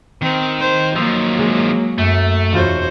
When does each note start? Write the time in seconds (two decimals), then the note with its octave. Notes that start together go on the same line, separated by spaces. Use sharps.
0.22 D#3 C4
0.60 C5
0.96 D#3 F3 F#3 A#3 C6 E6 G6
1.39 G#3 C7
1.98 F#2 A3
2.52 E1 F4 F#4 C5 C#5 D#7